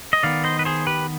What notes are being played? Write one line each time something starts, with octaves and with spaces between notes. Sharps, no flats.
D#5
D#3 B3 D5 F5
C5 D#5
B4
G#4 C5
G4 B4